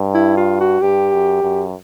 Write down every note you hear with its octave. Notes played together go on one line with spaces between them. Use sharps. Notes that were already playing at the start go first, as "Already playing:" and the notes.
Already playing: G2
E4
F4
F#4
G2 G4
F#2
F#2